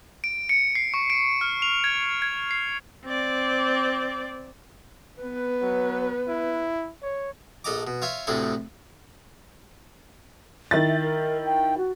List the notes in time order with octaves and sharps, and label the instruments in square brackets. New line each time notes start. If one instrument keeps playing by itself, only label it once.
[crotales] D7
C#7
C7
C#6
D7
F6
F7
G#6
G#6
C7
[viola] C4 D5
[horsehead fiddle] B3 B4
[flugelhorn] F#3
E4
C#5
[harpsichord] A#1 A4 D#5 A#5 D6
B2
F4 C#5 E5 F5
D2 A2 C3 G#4 A4
[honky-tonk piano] D#3 E4 A6
[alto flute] E5
A#4
G5
F#4